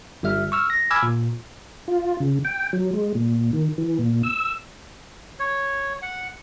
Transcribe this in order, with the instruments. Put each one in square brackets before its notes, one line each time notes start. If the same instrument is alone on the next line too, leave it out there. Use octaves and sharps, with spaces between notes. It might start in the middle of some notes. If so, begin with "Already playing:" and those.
[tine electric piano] G1 G3 E5 F6
C#6 E6 F6
A#6
G#5 B5 D6 E6 F6 G#6
A#2
[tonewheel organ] F4
C#3
G5
F#3
G#3
A#2
D#3
E3
A#2
E6
[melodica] C#5
F#5